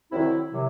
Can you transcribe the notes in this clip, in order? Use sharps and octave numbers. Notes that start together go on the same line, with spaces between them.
C2 C3 D#3 F#3 C4 E4
C3 D#3 F#3